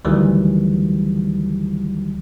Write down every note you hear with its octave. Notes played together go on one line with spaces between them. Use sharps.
D2 D#3 E3 F#3 G3